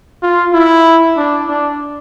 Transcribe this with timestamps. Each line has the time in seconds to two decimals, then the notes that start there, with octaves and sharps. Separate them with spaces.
0.22 F4
0.53 E4
1.16 D4
1.48 D4